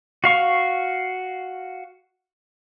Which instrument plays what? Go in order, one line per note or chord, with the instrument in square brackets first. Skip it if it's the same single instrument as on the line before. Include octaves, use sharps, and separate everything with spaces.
[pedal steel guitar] F#4 F5 C#6